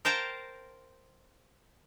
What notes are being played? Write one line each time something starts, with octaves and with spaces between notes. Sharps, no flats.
A#4 C5 F5 G5 A5 A#5